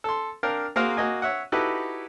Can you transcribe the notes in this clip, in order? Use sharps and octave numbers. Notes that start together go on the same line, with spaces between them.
A4 C6
D4 A#4 F5 G5
A#3 F#4 G#4 A#4 C5 F5
A#3 F#4 D#5 G#5
C#5 E5 F#5
D#4 E4 F#4 G4 A4 B4